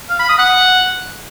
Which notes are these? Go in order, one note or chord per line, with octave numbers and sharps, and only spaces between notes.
F5
B5
D#6
F#5